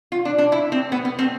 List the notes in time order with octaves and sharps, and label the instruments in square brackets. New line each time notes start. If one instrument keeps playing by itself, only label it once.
[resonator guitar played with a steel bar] F4
D4
D4
E4
C4
B3
B3
C4